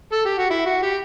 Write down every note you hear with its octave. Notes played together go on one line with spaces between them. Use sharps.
A4
G4
F#4
E4
F#4
G4